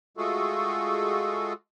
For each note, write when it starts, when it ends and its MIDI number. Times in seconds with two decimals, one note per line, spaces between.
0.17 1.53 56
0.17 1.53 57
0.17 1.53 65
0.17 1.53 66
0.17 1.53 68
0.17 1.53 69